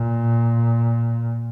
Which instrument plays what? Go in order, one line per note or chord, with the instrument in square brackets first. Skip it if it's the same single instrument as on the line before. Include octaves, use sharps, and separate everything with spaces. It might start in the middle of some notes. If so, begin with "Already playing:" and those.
Already playing: [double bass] A#2